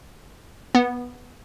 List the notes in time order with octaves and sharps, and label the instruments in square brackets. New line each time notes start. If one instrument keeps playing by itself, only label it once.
[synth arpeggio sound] B3